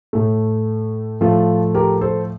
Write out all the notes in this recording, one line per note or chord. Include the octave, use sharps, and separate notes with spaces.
A2 A3
A2 F3 A3 F4 A4
G4 A#4
A4 C5